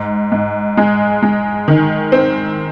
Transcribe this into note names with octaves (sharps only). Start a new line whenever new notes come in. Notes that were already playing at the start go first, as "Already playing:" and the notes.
Already playing: G#2
G#2
G#3
G#3
D#3
C4